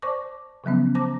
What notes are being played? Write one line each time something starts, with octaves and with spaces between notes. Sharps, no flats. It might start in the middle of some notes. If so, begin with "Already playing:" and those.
C5 D5 A5 C#6 D6
C#3 F3 F#3 B3 C#4
C5 A5 A#5 D6 A#6